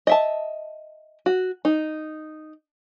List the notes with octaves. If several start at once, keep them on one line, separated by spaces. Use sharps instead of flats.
D#5 E5 A5
F#4
D#4